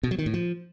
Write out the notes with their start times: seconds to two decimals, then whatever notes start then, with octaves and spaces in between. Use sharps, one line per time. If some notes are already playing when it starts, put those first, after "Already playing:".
0.03 B2
0.11 F#3
0.19 D#3
0.26 A2
0.34 F3